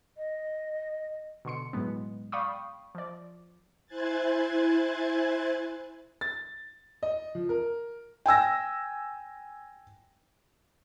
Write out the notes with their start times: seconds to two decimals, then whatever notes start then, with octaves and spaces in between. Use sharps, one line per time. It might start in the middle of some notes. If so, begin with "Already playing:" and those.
0.17 D#5
1.45 B2 D3 C6 C#7
1.73 A2 F#3 G#3 B3
2.32 D5 F5 G5 B5 C#6 D#6
2.95 F3 D5
3.87 E4 C5 G#5 F#6 G#6 A6
6.21 A6
7.03 D#5
7.35 F3
7.49 A#4
8.26 G5 G#5 E6 A#6